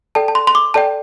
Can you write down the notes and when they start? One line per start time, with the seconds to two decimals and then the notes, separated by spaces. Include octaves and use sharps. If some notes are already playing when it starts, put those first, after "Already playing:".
0.15 A4 D5 G5 A5
0.28 A5
0.35 C6
0.47 C6
0.55 D6
0.74 A4 D5 G5 A5